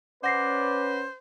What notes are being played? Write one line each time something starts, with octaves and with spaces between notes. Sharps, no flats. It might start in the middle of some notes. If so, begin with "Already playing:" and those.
C#4 B4 C5 D5 F#5 A#6 C7